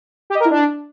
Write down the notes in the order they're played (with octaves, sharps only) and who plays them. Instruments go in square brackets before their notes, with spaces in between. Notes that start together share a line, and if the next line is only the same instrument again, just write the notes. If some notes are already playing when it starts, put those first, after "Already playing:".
[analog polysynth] G4
D#5
A#4
E4
D4